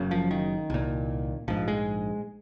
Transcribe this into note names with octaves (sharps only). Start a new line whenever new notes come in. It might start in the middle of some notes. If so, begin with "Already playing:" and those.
Already playing: F#1 F#2 C#3
F3
D#3
C2 A#2
A#1 G#2 F3
G#3